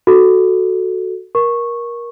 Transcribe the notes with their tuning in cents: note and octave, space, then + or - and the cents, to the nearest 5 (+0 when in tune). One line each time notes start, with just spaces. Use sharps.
F#4 +0 A4 -5
A#4 +20 C#6 -10